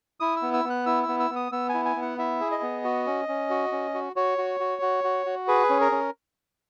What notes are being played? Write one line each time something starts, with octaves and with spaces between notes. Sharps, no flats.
E4 D#6
E6
B3
E6
B3
F#6
E4 E6
E6
B3
E6
B3
D#6
B3 E6
E4 G#5
G#5
B3
F#5
E4 E5
G#4
D#5
B3
F#4
C#4
C#4
F#4
C#4
F#4
F#4 C#5
F#4
F#4
F#4
F#4
F#4
G#4 B4
C#4
A#4
C#4